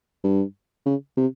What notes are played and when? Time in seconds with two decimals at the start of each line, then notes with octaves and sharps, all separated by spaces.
0.24 G2
0.86 C#3
1.17 C3